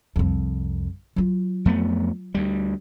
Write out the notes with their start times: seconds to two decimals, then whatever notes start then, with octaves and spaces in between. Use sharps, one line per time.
0.16 C2 F2
1.16 F#3 F4
1.65 F2 A3 B3
2.35 D2 G3